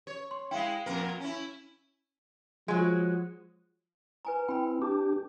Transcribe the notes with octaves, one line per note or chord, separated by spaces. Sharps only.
C#5
C6
G#3 E4 F5 G5
F2 A#2 A#4
C#4 E4
F3 F#3 G#3
B4 G#5 A#5
C4 E4 G5 B5
D4 G4